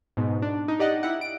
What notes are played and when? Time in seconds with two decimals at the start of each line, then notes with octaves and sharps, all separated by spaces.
0.17 G#2 B2
0.42 D4
0.68 D#4
0.79 G4 D5 D#5 F#5
1.03 E4 G4 F#5
1.21 D7